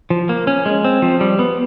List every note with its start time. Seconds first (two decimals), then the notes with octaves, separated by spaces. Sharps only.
0.10 F3
0.29 A#3
0.47 C#4
0.66 G#3
0.85 C4
1.02 F3
1.21 G3
1.39 B3